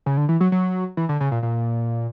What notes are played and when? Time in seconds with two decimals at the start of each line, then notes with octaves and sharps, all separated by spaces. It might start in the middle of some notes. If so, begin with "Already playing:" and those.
0.06 C#3
0.17 D3
0.29 E3
0.41 F#3
0.52 F#3
0.97 E3
1.09 D3
1.20 C#3
1.32 A#2
1.43 A#2